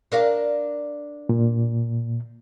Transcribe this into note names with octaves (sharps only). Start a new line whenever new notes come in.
D4 A#4 F5
A#2